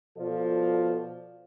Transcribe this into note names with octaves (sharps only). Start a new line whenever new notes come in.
B2 F3 F4 A4 D5